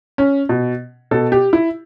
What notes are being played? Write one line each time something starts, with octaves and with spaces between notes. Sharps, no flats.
C#4
B2
B2 A4
G4
E4